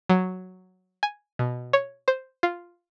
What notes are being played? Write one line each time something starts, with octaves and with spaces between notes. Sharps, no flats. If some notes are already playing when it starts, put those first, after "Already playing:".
F#3
G#5
B2
C#5
C5
F4